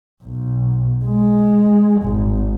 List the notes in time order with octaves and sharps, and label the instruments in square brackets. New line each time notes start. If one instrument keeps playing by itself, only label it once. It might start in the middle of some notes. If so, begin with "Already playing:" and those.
[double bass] B1
G#3
G#1